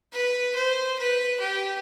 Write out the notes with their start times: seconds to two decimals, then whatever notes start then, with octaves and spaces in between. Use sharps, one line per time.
0.13 B4
0.55 C5
0.98 B4
1.40 G4